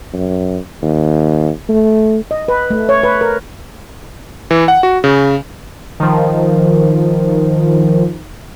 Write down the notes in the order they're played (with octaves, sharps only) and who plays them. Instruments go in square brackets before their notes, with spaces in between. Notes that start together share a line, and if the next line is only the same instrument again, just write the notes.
[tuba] F#2
D#2
A3
[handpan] D#5
B4
A3
C#5
B4
A#4
[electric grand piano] E3
F#5
F#4
C#3
[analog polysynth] D#3 F3